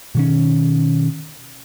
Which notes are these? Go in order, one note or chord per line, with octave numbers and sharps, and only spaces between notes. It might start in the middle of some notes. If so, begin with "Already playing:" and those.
B2 D#3 C#4